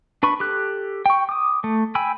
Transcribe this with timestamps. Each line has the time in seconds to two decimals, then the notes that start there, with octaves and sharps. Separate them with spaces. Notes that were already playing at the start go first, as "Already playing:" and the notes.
0.23 D4 B4 B5 C#6
0.40 G4 A4 F#6
1.06 G5 C#6
1.29 D6 D#6
1.64 A3
1.95 G5 G#5 B5 E6